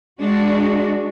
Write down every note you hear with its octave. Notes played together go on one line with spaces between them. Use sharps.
G#3 D4 F#4